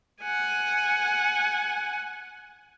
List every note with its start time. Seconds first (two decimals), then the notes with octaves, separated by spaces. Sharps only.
0.22 F#5 G#5